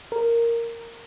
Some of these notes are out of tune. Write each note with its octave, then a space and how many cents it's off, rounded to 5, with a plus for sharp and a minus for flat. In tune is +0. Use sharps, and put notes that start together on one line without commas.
A#4 -5